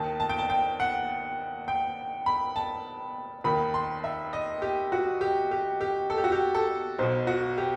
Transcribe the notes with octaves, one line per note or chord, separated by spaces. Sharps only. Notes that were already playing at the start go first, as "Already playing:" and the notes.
Already playing: D#2 D#3 A5
A5
G5
A5
G5
F#5
G5
B5
A5
D#2 D#3 B5
C6
E5
D#5
G4
F#4
G4
G4
G4
A4
G4
F#4
G4
A4
B1 B2 C5
F#4
G4